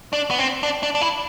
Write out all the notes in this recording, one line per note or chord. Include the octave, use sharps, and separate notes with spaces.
D4
B3
C4
D4
D4
D4
E4